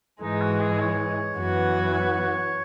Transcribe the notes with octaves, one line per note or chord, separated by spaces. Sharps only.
G#2 E3 G#3 D#4
F#4
G#4
C#5
F#2 E3 B3 F#4
C#5